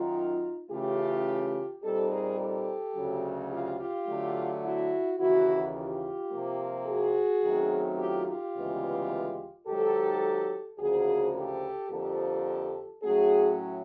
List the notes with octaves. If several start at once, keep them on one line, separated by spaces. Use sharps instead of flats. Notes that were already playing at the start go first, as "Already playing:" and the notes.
Already playing: F#2 D#3 F#3 D#4 F4
C#3 E3 A3 C#4 F4 G4
A#2 G3 C4 D#4 G4 A4
G#4 A#4
G4 A4
D2 C#3 F#3
F4 G4
F4 G4
D3 F#3 A3
E4 F#4
D#2 C#3 E3 E4 F#4
F4 G4
C3 F3 A#3
F#4 G#4
F#2 D#3 F#3 A3 C4
F4 G4
F4 G4
D2 C#3 E3 G#3 B3
G#2 D#3 F#3 G4 A4
D2 C#3 F3 A#3 F#4 G#4
G4 A4
F2 D3 F3 A#3 G4 A4
A2 F#3 A3 C#4 F#4 G#4